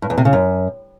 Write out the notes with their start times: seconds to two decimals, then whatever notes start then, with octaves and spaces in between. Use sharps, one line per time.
0.02 G2
0.10 E2
0.18 C3
0.25 C#3
0.33 F#2